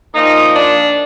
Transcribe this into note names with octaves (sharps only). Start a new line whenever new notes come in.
A#2 F3 D#4
D4